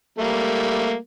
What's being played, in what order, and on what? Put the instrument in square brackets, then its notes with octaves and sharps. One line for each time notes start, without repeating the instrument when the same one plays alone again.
[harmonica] G3 A3 A#3